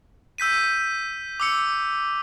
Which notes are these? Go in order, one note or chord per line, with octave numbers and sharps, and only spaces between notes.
E6 G6 B6 D#7
D6 E6 C#7